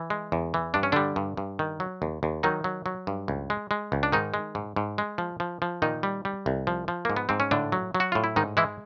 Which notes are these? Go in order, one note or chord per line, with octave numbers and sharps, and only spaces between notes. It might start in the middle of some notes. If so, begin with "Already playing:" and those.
Already playing: E3
G#3
E2
E3
G2 D4
C#4
D3 G3 D4
G2
G2
D#3
F#3
D#2
D#2
D#3 F#3 D#4
F#3
F#3
G2
C#2
G#3
G#3
C#2
D4
G#2 D#3 D#4
G#3
G#2
G#2
G#3
F3
F3
F3
A#2 D#3 D#4
G3
G3
C2
F3
F3
G#2 A#3
B3
G#2 C4
C#4
A2 D3 D4
F#3
F#3
F#4
A2 F4
E4
G#2 D#3 D#4
E3 G#3 E4